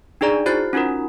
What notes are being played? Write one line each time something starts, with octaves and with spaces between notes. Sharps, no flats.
D4 D#4 G#4 D5 A#5
E4 F#4 C5 F#6 A6 C7
C#4 D#4 F4 F#4 A#4